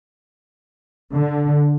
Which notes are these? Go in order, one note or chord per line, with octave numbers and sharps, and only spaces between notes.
D3